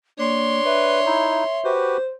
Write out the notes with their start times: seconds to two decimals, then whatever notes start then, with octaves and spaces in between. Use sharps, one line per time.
0.19 A#3 D4 C#5 C6
0.65 B4 E5
1.06 D#4 E4
1.65 F#4 G4 B4 C5